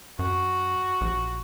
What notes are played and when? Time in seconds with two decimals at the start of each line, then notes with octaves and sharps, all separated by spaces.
0.19 F#2 F#4
1.01 A#1